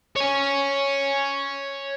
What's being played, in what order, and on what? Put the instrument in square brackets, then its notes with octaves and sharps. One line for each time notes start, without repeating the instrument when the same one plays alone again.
[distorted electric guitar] C#5 G#5